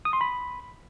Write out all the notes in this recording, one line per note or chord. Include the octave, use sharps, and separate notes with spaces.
D#6
C6
B5